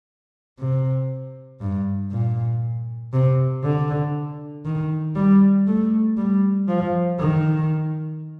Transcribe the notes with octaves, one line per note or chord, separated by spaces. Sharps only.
C3
G2
A#2
C3
D3
D#3
G3
A3
G3
F3
D#3